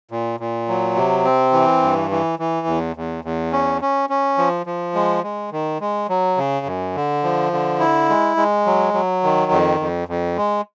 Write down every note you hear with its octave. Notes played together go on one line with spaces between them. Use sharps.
A#2
A#2
F#3
C3
C4
E3
G2
E3
E3
E2
E2
E2
C#4
C#4
C#4
F3
F3
G#3
G#3
D#3
G#3
F#3
C#3
F#2
D3
F3
D3
E4
G#3
G#3
F#3
F#3
D#3
F2
F2
F2
G#3